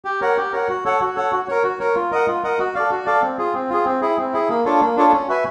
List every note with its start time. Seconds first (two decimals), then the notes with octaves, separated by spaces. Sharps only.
0.05 G4
0.21 A#4 C#5 F#5
0.37 G4
0.52 A#4 C#5 F#5
0.68 F#4
0.85 A4 C#5 F#5
1.01 F#4
1.15 A4 C#5 F#5
1.32 F#4
1.48 A#4 C#5
1.64 F#4
1.79 A#4 C#5
1.95 F4
2.11 A#4 D#5 F#5
2.27 F4
2.43 A#4 D#5 F#5
2.59 F#4
2.75 A4 D5 F5
2.91 F#4
3.06 A4 D5 F5
3.22 C4
3.38 F4 G#4
3.54 C4
3.70 F4 G#4
3.85 C4
4.01 E4 G#4
4.18 C4
4.33 E4 G#4
4.49 A#3
4.65 D4 F4 A4 C#5
4.81 A#3
4.96 D4 F4 A4 C#5
5.12 C#4
5.28 F#4 B4 E5 G#5